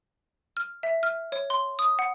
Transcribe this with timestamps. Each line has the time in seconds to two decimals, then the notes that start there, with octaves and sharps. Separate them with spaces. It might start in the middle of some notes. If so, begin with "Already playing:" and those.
0.57 F6
0.83 E5
1.03 F6
1.32 C#5
1.50 C6
1.79 D#6
1.99 F#5